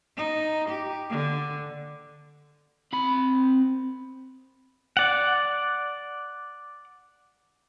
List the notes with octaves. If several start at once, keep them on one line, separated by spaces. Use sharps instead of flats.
D#4
G4
D3
C4 B5
D5 F#5